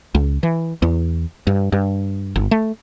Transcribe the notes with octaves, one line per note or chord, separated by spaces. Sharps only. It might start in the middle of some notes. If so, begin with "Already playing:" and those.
C#2
E3
E2
G2
G2
G1
A3